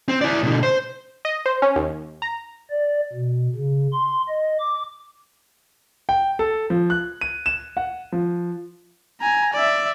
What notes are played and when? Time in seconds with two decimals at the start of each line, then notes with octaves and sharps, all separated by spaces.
0.08 C4
0.21 E4 D5
0.43 B2 D3
0.63 C5
1.25 D#5
1.46 C5
1.62 C#4
1.76 D#2
2.22 A#5
2.70 D5
3.13 B2
3.55 C#3
3.93 C6
4.29 D#5
4.60 D6
6.09 G5
6.39 A4
6.70 F3
6.90 F#6
7.21 D#7
7.46 E7
7.77 F#5
8.12 F3
9.21 G#5 A#5
9.54 D5 E5